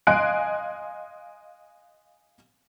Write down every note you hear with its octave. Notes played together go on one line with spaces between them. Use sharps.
D#5 F5 G#5 C6 F#6 D7